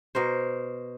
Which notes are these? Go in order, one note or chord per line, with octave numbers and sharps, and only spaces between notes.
B2 A#4 C5